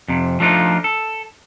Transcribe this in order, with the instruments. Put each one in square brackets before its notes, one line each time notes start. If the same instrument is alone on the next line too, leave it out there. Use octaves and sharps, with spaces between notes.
[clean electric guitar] F2 C3
F3 A3 D4 D#4 F4
A4